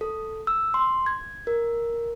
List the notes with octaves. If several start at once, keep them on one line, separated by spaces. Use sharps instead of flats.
A4
E6
C6
G#6
A#4